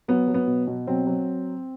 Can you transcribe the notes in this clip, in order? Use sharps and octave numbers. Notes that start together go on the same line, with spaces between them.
F#3 B3
F#3
B3
B2
B2
F#3 C4
F#3